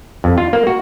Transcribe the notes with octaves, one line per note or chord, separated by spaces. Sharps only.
F2
F4
A#3
F#4